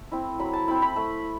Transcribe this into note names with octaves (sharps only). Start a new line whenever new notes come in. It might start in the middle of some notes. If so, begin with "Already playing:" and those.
Already playing: A3
C4 E4
F#3 B5
A5
C4 E4 B5
B5
A3